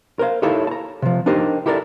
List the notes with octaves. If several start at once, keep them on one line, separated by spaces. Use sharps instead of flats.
A#4 C5 F5
D#4 E4 G4 A4 C#5 F5
A5 A#5
C3 F3
D4 D#4 G4 A#4 C5
E4 G4 A4 A#4 C5 D5